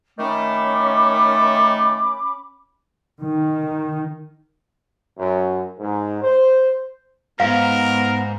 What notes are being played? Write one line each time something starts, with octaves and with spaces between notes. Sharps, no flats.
D#3 A3 C#4 B5 D6
D#3
F#2
G#2
C5
G#2 B3 A#4 F5